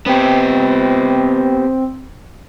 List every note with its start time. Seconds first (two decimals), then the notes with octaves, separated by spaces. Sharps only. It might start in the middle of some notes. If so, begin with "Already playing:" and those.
0.06 B3 C4 G4